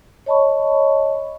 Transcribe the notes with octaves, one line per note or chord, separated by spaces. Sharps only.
C#5 D#5 A5 B5 C#6